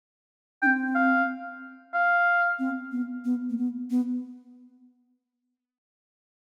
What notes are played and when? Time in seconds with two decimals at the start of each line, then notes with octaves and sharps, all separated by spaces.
0.62 D4 G5
0.66 C4
0.95 F5
1.93 F5
2.59 C4
2.92 B3
3.25 B3
3.50 A#3
3.58 B3
3.90 B3